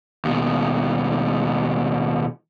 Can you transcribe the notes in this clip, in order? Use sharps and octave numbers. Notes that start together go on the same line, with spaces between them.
D#2 B2